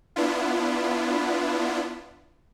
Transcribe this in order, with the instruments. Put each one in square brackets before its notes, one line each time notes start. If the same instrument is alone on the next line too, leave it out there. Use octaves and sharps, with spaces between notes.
[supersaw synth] B3 D4 E4 F4